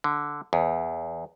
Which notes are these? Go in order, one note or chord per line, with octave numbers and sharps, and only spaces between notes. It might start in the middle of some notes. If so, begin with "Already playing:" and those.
D3
E2